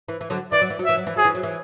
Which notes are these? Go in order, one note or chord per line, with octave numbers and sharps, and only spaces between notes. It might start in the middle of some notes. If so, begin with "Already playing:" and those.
E3
E3
D3 F#3
E3 D5
F#3
E3
F#3
E3 E5
F#3
E3
F#3 G#4
E3
F#3
E3